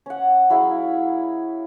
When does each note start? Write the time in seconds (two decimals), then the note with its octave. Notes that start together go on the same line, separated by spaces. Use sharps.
0.06 C#4 F#5
0.50 F#3 E4 G#4 F5